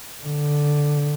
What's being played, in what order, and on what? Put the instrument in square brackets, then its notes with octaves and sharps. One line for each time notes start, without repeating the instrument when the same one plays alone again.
[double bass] D3